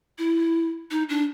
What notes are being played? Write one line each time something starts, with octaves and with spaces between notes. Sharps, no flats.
E4
D#4
D4